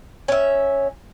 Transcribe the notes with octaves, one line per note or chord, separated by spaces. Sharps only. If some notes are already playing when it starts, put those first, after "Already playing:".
C#4 E5